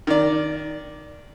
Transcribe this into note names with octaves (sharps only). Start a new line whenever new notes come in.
D#3 D5